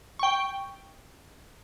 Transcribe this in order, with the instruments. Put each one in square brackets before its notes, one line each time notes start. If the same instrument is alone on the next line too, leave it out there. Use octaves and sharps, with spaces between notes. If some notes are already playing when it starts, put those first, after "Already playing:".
[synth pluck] G5 C#6